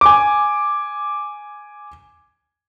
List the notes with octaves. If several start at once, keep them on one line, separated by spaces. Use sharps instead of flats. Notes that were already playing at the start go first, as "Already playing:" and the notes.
G#5 D6